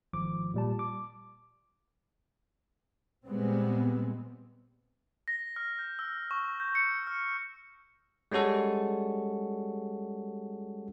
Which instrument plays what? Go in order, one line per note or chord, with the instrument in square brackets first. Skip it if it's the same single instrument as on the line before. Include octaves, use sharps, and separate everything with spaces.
[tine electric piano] G#1 F3 D6
A#2 G3 A5
D6
[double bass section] A#2 G3 G#3 B3 C4
[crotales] A#6
F6
G6
E6
C#6
G6
C#7
F6
[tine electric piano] G3 G#3 C#4 F#4 A4